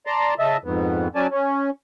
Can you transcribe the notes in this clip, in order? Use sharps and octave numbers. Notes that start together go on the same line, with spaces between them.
D5 A5 A#5 C6
C#3 D#5 E5 A5
F2 G#2 B3
F#3 C#4 D5 G#5 A5
C#4